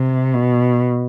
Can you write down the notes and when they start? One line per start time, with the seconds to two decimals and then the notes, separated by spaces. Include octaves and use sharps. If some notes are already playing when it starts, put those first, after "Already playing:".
Already playing: C3
0.34 B2